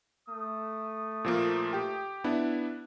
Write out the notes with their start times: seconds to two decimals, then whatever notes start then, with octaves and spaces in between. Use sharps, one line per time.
0.28 A3 D#6
1.24 A#2 F3 A#3
1.73 G4 G5
2.24 B3 D4 E4